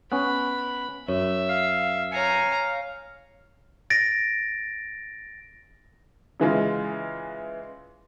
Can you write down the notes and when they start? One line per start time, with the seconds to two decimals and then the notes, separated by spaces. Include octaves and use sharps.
0.12 B3 C#4 B5 F#6
1.08 F#2 C#5 E5
1.49 F5 C7
2.12 C#5 F5 G#5 A#5 C7 C#7
3.90 A6 A#6 D7
6.40 C#3 E3 G#3 F4